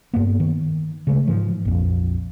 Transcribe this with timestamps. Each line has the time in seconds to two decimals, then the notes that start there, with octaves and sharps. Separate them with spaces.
0.14 G2 A#3 B3
0.40 D#3
1.07 C#3 G#3 A3
1.28 G#2 E3 F3
1.65 A#1 F2